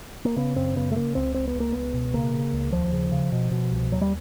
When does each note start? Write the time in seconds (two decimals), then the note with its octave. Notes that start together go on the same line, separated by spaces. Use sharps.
0.25 A#3
0.36 C#3 B3
0.56 F#2 C4
0.76 C#3 B3
0.92 A3
0.96 C#3 A#3
1.15 C#2 C4
1.34 C#2 C4
1.48 B3
1.55 C#2
1.60 A#3
1.72 C#2 B3
1.94 B2
2.14 C#3 A#3
2.34 C#3
2.53 C#2
2.72 D#2 F3
2.92 C#3
3.12 C#3
3.32 B2
3.51 B2
3.71 C2
3.92 D#2 F#3
4.02 G3